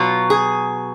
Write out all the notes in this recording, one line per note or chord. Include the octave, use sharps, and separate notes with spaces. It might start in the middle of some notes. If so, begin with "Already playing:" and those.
Already playing: B2 F#3 F4
G#4